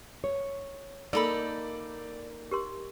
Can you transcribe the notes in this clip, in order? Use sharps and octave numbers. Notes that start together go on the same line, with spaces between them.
C#5
A#3 D#4 A4 A#4 D5 B5
G4 A#4 C6